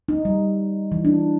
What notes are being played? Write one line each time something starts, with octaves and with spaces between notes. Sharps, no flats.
D#4
G3
E3
D4